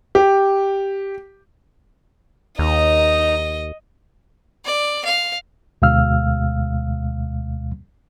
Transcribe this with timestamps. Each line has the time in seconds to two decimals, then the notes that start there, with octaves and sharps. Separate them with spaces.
0.15 G4
2.59 D#2 D#4 D#5 A#5
4.65 D5
5.05 F5
5.82 D2 B2 G#3 F5 E6 F6